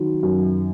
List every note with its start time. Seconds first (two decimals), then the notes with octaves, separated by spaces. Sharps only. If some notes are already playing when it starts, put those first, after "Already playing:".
Already playing: D#3 F#3
0.23 F#2